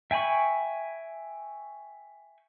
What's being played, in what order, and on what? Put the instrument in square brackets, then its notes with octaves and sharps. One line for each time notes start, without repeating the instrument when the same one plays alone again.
[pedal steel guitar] E5 G5 G#5 B5 C#6